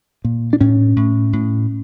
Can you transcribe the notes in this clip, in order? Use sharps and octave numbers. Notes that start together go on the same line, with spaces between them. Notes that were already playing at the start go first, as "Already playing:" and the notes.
A#2
D4
A2 C#4
A2
A2